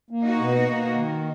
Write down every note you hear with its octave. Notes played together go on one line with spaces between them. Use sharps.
A#3
D#4 F#4
B2
A#3
D#3